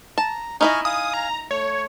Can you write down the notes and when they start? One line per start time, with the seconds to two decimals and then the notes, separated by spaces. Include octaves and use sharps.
0.18 A5 A#5
0.61 D#4 E4 D#5 G#5 C#6 F6
0.85 F5 G#5 D#6
1.13 A#5
1.51 A3 C#5